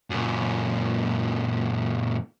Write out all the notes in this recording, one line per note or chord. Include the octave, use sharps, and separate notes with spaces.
F#2 A#2